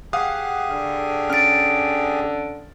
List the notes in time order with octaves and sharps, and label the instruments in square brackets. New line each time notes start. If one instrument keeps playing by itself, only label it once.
[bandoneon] G4 G#4 G#5 [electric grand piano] F5 F#5 D#6
[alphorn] D3 [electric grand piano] F5
[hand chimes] C#4 D7 [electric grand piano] F6 A6